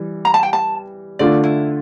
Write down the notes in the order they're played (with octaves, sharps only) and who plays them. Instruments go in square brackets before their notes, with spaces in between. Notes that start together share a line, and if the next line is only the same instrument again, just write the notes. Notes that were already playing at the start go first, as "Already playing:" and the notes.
Already playing: [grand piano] E3 G3
[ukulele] A#5
A5
G5
A5
[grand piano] D3 A3 D4 F4 [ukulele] D5
[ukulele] E4